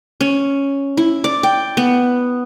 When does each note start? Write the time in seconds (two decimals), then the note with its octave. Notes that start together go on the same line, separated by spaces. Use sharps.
0.21 C#4
0.97 E4
1.24 D5
1.43 G5
1.77 B3